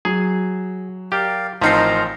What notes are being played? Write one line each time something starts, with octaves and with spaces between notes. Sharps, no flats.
F#3 G#4
G4 A#4 D5 F5
A1 F3 C4 D#4 A#4 A#5 C7